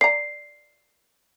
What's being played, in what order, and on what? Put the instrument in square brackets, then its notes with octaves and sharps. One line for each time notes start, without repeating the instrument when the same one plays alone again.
[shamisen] D5 A#5 [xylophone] C7